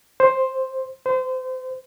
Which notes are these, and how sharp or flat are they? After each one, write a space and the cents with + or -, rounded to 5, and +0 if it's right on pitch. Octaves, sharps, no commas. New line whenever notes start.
C5 +5
C5 -30